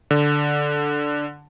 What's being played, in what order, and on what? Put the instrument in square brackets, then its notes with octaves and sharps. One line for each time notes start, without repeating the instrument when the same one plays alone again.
[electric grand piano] D3